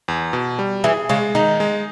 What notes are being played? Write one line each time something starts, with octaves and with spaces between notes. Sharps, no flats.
E2
B2
G3
E3 G#4
C#3 G#3
D#3 D#4
G#3